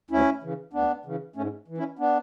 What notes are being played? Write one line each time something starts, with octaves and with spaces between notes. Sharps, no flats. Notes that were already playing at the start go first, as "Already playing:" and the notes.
D2 C#4 E4
C#3 E3
D2 B3 D4
C#3 E3
G#2 A3 C#4
E3
C#4 E4
B3 D4